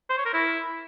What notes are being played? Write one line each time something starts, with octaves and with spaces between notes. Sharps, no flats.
C5
C#5
A#4
E4